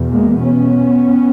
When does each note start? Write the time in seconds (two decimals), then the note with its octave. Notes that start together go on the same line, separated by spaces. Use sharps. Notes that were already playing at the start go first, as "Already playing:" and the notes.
Already playing: E2 B2
0.11 G#3 A#3
0.41 B3 C#4